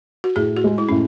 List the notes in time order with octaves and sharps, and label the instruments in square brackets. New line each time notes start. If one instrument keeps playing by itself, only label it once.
[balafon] F#4
[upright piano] A2 [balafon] G#4
[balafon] F#4
[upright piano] G#3
[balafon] E4
[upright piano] A2 [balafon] C#4